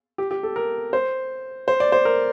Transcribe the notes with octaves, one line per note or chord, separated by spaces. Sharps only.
G4
G4
A4
A#4
C5
C5
D5
C5
A#4